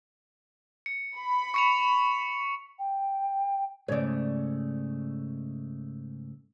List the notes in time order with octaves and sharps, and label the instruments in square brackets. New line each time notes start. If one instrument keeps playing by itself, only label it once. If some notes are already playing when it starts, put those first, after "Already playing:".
[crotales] C#7
[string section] B5
[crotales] C#6 C#7 F7
[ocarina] G5
[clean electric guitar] G#2 C#3 A3 [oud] C#5 D5